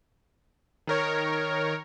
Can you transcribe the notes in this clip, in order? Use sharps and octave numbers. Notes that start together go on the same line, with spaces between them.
D#3 A#4 C#5